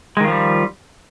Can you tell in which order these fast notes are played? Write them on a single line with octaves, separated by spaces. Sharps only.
G#3 D#3 F4 F3 G3